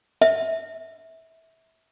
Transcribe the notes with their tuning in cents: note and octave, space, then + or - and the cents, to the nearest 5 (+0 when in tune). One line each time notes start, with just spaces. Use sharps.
E5 -20